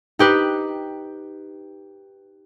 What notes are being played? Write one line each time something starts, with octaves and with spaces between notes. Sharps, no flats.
D#4 G4 B4